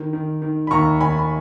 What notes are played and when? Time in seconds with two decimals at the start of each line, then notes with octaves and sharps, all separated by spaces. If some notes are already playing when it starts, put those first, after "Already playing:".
Already playing: D#3
0.13 D#3
0.42 D#3
0.67 B5
0.71 D#2 A#5 C#6
1.01 D#2 G#5 B5
1.19 B5